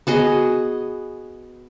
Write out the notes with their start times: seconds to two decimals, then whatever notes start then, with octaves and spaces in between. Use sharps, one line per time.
0.07 B3 F#4 G#4 D#5